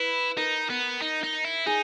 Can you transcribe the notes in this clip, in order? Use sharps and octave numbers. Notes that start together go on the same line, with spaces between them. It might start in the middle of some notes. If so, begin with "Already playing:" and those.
Already playing: E4 B4
D#4 A#4
B3
D#4
D#4
E4
D#4 G#4